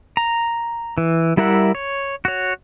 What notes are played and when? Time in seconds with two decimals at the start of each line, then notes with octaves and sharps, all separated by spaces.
0.17 A#5
0.98 E3
1.37 G3 E4 A#4 E5 F#5
1.75 C#5
2.25 F#4 C#5